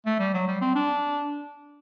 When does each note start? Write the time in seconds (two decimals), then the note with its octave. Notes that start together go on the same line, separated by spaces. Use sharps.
0.06 A3
0.19 G3
0.34 F#3
0.48 G3
0.61 C4
0.75 D4